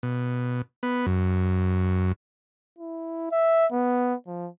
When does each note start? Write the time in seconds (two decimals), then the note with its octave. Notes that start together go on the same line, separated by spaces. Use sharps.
0.03 B2
0.83 B3
1.06 F#2
2.79 E4
3.32 E5
3.72 B3
4.27 F3